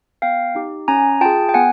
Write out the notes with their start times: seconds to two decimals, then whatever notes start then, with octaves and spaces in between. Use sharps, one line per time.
0.22 B3 F5 G5
0.55 D#4 G4
0.88 C#4 G#5 A#5
1.21 F4 G#4 G5 A5
1.49 G5
1.54 B3 F#5 G#5